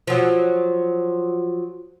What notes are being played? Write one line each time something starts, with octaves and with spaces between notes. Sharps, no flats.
F3 F#3